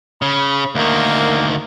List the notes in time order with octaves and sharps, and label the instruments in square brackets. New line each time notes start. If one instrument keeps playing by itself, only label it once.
[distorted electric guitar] C#3 [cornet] B5
[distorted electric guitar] D2 D#3 [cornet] A#3